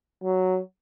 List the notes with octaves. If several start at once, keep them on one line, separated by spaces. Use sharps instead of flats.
F#3